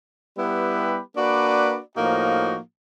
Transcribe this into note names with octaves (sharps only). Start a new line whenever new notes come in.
G3 B3 E4 G4 B4
A#3 D4 F#4 B4 D5
A2 F3 A#3 D#4 F#4